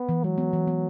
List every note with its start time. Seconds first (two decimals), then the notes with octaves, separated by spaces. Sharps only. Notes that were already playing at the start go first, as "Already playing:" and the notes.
Already playing: B3
0.09 E3
0.24 F#3 G#3
0.38 B3
0.53 E3
0.67 B3